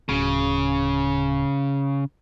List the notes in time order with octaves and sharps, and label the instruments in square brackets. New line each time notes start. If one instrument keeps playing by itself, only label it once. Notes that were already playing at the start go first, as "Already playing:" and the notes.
[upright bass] D1 [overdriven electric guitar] C#3